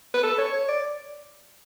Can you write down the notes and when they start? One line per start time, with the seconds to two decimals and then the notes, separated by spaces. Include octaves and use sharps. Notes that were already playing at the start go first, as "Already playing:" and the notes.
0.14 B4
0.23 A4
0.38 C#5
0.53 C#5
0.69 D5